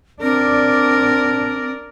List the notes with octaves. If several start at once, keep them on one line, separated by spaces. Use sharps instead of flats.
C4 D4 A#4 D5